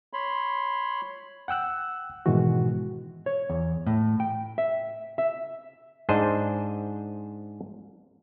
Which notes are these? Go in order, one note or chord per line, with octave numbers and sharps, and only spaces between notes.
C#5 B5 C6
F#5 G5 E6 F#6
G#2 B2 D#3 E3 G#3 F#4
C#5
E2
A2
G5
E5
E5
G#2 D4 G#4 C5 D#5